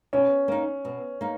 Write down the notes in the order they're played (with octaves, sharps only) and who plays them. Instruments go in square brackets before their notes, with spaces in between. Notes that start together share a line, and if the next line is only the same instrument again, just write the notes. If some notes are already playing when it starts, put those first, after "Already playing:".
[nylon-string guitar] B2 [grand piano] C#4
[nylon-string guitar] A#3 D#4
B2
A#3 D#4